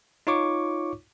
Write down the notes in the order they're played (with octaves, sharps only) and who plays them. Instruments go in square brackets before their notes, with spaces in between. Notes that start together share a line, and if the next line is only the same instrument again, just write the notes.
[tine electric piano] D#4 F4 C#5 C#6 D6